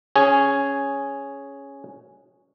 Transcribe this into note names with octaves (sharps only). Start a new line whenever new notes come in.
C#4 G#4